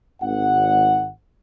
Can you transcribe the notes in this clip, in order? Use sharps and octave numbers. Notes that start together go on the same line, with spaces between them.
G#1 F#5